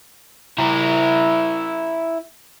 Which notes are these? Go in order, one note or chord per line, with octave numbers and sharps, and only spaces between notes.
E4 A#4